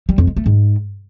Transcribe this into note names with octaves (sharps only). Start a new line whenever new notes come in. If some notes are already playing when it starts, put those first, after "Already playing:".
G3
F2
G#3
A3
G#2